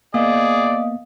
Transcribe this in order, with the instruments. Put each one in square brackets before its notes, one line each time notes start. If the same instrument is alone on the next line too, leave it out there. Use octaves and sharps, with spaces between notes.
[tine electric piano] A#3 B3 [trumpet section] G#4 D5 [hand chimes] D#5 F5 D#6